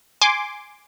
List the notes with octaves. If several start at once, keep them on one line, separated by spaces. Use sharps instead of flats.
G#5 C6 D6